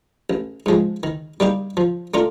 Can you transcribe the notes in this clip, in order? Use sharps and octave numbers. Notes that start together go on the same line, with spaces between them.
A1
G#2 F3 G#3
D#3
G3 A#3 D#4 G4
F3
A3 D4 F4 A#4